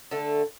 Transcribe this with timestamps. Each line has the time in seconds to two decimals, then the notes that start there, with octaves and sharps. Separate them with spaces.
0.11 D3 A3